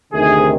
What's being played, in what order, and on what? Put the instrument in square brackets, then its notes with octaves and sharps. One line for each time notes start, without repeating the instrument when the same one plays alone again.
[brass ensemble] D2 C3 D#3 G#4